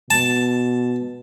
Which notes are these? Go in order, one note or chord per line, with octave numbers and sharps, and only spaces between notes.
B2 A5